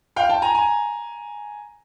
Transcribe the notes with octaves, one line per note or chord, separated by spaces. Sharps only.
F5 G5
G5 A5
G#5 A#5
G#5 A#5